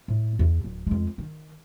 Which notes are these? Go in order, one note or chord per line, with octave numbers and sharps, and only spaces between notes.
A2
E2
D1
F2 G#3
D#3